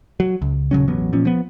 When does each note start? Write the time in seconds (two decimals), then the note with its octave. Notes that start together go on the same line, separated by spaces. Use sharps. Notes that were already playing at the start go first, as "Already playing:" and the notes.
0.20 F#3
0.42 C#2
0.71 D#1 C#3 F#3 C#4
0.88 E1 A1 F#3 B3
1.13 A#2 F3 C#4
1.25 F3 B3